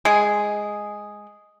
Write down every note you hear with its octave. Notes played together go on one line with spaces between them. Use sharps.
G#3 G#4